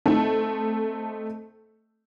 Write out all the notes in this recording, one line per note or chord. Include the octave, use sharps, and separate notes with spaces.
A3 C4 D#4 A4